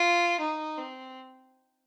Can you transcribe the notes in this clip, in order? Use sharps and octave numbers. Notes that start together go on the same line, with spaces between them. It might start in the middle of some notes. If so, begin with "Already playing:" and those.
Already playing: F4
D#4
C4